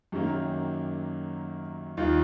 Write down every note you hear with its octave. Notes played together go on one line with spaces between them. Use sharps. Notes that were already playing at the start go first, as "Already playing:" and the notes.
F#2 D#3 F#3 A#3 C#4 G4
D#2 D#3 G3 F4